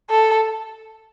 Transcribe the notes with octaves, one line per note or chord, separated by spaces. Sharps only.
A4